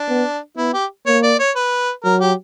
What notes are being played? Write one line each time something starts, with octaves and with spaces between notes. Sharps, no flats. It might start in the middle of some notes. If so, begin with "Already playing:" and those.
Already playing: D4
B3
B3 E4
G4
A#3 C#5
D5
C#5
B4
F#3 A#4
G4